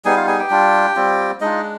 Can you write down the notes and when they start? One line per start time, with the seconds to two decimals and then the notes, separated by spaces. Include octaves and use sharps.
0.05 G3 B3 D#4 G#4 G#5
0.16 F4 F5
0.27 G#4 G#5
0.39 G4 G5
0.50 G3 D4 F4
0.95 G3 C4 F4
1.41 G#3 D4 D#4 F4 D#5